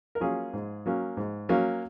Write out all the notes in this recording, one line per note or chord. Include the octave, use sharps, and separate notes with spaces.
A#4
F#3 A#3 C#4 F4 G#4
G#2
F#3 A#3 C#4
G#2
F#3 A#3 C#4